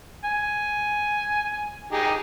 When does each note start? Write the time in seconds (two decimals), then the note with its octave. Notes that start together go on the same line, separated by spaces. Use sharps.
0.24 G#5
1.92 D#4 G4 G#4